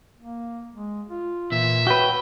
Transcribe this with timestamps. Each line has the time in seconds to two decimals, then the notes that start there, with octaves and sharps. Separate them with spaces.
0.18 A#3
0.75 G#3
1.09 F4
1.52 A#2 E3 E5
1.87 F#4 B4 C#5 G5